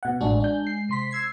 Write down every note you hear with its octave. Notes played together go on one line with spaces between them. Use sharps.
B2 F#5
A1 G#3 D4 F#4
D4 G6
C7
C3 C6 B6
E6 G#6 C7